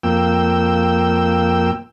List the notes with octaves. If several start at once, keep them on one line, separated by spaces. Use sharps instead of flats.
F2 A#3 G5 E6